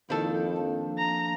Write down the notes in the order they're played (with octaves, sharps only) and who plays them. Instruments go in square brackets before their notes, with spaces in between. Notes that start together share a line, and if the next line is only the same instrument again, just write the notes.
[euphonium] F2 [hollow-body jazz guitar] D#3 A4 [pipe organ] A#3 E4 C5
[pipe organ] F3 A#3 D4
[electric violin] A#5